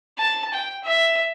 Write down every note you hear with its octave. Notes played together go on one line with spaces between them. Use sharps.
A5
G5
E5